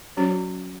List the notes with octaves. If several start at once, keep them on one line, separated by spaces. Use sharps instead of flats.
F#3 C#4 F#4 C#5